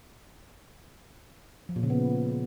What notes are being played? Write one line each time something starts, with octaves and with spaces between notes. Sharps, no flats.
F3
A#2
C#3
B3